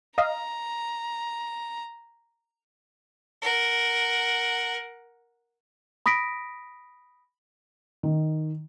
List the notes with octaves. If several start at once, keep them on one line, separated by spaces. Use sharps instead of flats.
D#5 F5 A#5
A#4 F#5
B5 D#6 A#6 B6 D7
D#3